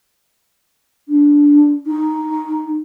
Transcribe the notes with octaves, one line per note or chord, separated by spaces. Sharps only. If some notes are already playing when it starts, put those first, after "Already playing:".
D4
D#4